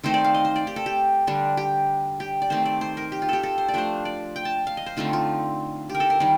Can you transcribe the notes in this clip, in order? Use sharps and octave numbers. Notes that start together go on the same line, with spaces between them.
D#3 A3 C4 D#4 C5
D5
F5
D#5
C5
D5
G4
A4
G4
D3 G3 D4
G4
G4
D5
D#3 A3 C4 C5
D5
C5
A#4
G4
F4
G4 A4
A4
C5
D5
F3 A3 D4 C5
D5
G5
A5
F5
D#5
C5
D3 A3 C4 D#4 F4
F4
G4
A#4
A4
A#4
D#3 G3